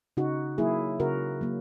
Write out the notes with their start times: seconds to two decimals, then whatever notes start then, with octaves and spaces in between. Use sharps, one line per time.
0.17 C#3 D#4 F#4
0.58 F#3 A#3 E4 G#4
1.00 C#3 F#4 A#4
1.41 F#3 A#3